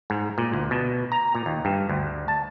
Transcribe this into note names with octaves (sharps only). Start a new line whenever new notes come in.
G#2
A#2
D2
B2
A#5
A#2
D#2
G2
D2
A5